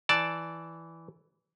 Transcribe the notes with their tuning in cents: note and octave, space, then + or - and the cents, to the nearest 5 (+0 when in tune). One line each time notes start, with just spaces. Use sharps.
E3 +0 D5 +0 A5 +0